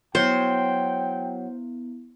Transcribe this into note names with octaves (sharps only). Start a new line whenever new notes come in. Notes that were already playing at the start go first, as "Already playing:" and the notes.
F#3 B3 E4 C5 G5